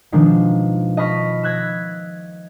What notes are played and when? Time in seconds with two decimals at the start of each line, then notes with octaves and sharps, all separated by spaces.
0.12 B2 D#3 F3 G#3 D4 F4
0.97 D#5 A5 B5 C#6 F6 B6
1.43 E6 F#6 G#6 A#6 B6